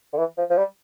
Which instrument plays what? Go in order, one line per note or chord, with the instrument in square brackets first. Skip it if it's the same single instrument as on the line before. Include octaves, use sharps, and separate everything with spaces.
[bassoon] D3
E3
F3
F3
G3